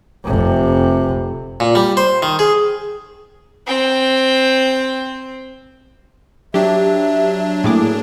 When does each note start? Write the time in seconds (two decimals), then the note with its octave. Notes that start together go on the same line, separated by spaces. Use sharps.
0.25 F1 C3
1.60 A#2
1.75 G3
1.97 C5
2.22 D#3
2.39 G#4
3.67 C4 G5
6.54 F#3 D4 G4 E5
7.64 A2 A#3 G#4 D6